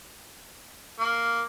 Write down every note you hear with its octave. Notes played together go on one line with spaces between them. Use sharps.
A#3